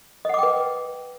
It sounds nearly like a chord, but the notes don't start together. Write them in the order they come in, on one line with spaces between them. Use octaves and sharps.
D#5 F#5 D6 G5 B4